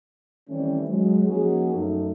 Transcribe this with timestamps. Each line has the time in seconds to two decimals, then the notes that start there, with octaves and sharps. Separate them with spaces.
0.49 D#3 E3 G3 A3 C4 C#4
0.88 F#3 G#3
1.27 F3 A#3 C#4 D#4 F#4 G#4
1.73 F#2 A3 D#4